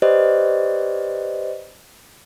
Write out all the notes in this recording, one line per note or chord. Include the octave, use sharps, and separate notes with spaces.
G4 B4 C5 D5 D#5